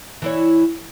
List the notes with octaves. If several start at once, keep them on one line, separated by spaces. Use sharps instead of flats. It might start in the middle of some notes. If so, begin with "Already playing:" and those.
E3 E4 C#5